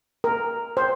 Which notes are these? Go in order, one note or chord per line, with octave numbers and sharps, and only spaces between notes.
A#4
C5